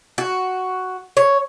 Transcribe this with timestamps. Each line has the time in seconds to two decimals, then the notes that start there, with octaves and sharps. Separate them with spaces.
0.18 F#4
1.17 C#5